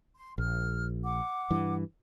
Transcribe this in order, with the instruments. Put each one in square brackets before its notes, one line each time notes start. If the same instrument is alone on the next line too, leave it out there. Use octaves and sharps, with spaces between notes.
[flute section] C6
[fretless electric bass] A#1 [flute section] F6
[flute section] F#5 D6
[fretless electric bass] G2 E3